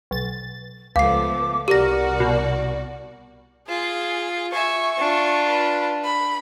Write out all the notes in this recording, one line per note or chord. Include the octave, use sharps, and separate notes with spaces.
B1 A6
C#2 F3 A3 B3 F5 D6 C7
C2 F#4 G4 A#4 D5 A#6
B2
F4 G#4
E5 G#5 C#6
D4 F4
B4
B5